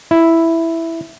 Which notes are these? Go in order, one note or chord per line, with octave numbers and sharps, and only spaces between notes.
E4